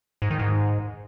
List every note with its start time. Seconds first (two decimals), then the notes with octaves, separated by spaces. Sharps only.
0.22 G#2
0.30 D#3
0.39 G#2